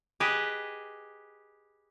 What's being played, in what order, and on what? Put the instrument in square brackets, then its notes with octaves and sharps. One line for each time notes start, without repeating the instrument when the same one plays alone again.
[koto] G4 G#4 B4 D#5